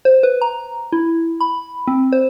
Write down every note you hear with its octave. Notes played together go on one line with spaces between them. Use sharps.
C5
B4
A#5
E4
B5
C4
C5